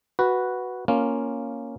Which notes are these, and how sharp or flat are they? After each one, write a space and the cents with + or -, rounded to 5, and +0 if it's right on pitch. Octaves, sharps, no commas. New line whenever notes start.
F#4 +0 B4 -5
A#3 +0 C#4 +0 F4 +0